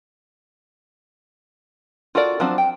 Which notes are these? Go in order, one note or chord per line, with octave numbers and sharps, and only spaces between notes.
F4 F#4 A4 A#4 D5
F3 F#3 C4 D4
G5